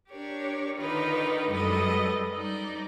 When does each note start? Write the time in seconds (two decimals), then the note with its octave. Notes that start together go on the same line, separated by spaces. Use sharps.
0.11 D4 G4 A#4 C#5
0.78 D3 D#3 D#4 F4 A#4 B4
1.50 F#2 G3 G#3 A4 B4 D#5
2.35 G3 D#4 D5